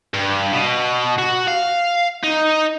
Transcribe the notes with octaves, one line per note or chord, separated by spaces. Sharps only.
G2
B2
F#4
F5
D#4